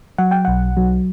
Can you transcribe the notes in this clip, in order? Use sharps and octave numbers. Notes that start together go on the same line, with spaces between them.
F#3 F#5
G5
B1 F#5
F#3